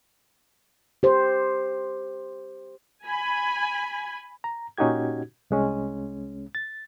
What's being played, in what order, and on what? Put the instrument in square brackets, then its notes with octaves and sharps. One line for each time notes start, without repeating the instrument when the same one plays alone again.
[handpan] G4 C5
[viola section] G#5 B5
[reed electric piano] A#5
A#2 C#4 D#4 F#4 G4 G#6
C2 G#3 C#4
A6